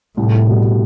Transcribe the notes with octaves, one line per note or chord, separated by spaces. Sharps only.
C2 A2
B2 G3